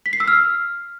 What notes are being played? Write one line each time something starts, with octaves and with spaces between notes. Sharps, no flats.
B6
C7
E6
F6